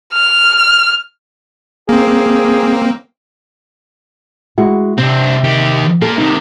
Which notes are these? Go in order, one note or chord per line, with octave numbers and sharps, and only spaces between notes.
F6
A#3 C4 G#4
G#3 E4 F#4
C3 C4 D4
D#3 G4
A#3 F4 A4
C3 D#3 D#4